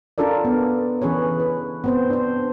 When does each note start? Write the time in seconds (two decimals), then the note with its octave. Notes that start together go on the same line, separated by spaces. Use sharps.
0.18 C#4 D4 F4 A4 A#4 D5
0.45 B3
1.02 E3 C#4 G#4 B4 C#5
1.40 B4
1.84 B3 C4 C5
2.10 D4 C5